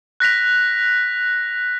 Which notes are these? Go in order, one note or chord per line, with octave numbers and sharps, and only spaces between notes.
F#6 A#6 B6 F7